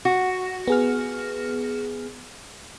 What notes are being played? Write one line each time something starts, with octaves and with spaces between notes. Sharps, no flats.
F#4
B3 G#4 F6